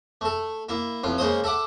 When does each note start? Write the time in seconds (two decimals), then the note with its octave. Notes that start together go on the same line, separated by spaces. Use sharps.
0.21 A3 A4
0.69 A#3 E4
1.04 A1 F2 F4
1.18 C#3 G#3 A#3 C5 D#6
1.44 A4 E5 F#5 D6